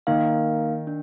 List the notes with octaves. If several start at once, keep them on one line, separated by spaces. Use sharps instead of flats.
D#3 A#3 D#4 A#4 F5
D4